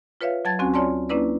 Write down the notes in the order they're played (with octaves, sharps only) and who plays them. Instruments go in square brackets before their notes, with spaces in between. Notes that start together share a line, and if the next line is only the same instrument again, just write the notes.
[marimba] F4 B4 C#5 E5 F5
F#3 A5 G#6 A6
D2 C4 C#4 F#4 G#5
F4 C#5 D5 G#5 A5 C6
A#3 C#4 D4 E4 B4 D5